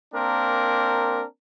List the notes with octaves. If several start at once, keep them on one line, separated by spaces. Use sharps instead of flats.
A#3 C4 D4 A#4